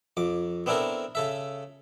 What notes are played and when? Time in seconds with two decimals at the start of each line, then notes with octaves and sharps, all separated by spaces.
0.17 F2 D6
0.66 B3 C4 D4 E4 A4 A#4
1.15 C#3 A4 E5